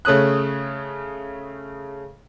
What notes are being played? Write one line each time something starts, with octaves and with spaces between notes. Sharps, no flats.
C#3 A3 C#4 D#6 F#6